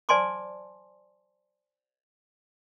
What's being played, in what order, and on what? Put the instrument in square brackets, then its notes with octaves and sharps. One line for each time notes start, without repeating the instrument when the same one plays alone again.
[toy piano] C5 D5 G#5 A5 C6 D6